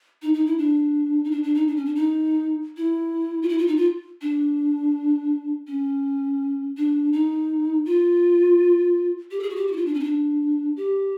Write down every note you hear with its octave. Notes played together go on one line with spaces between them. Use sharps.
D#4
D#4
E4
D4
D#4
D4
D4
D#4
D4
C#4
D4
D#4
E4
F4
E4
F4
D#4
F4
D4
C#4
D4
D#4
F4
G4
A4
G#4
F#4
G4
F#4
E4
F4
D4
C#4
D#4
D4
G4